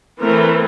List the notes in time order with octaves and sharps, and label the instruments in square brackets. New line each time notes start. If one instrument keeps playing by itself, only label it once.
[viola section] E3 A3 C4 A#4